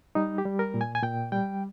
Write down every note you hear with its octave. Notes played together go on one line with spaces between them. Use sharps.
G3 D#4
G4
G3
A#4
A#2
G#5
G#5
A#2 G5
G3 G5